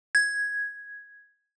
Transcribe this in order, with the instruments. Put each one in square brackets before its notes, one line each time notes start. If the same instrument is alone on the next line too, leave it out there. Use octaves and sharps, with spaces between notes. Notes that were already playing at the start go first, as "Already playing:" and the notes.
[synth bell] G#6